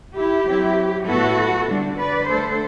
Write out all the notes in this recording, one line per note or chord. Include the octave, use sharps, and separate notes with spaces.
E4 G4
F#3 C4 E4
A2 F#3 B3 E4 F#4 A4
D3 G3 D4
B4 D5
D3 A3 D4 A4 C5